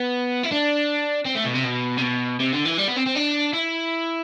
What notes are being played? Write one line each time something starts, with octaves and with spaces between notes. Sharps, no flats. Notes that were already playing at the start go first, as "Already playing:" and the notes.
Already playing: B3
E4
D4
C4
A3
B2
C3
B2
C3
B2
C3
D3
E3
G3
B3
C4
C4
D4
E4